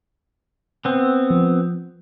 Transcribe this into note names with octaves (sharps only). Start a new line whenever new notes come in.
B3 C4
F3